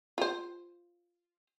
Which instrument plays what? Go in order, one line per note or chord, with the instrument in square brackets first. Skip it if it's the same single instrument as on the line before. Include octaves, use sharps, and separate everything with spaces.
[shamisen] F4 C5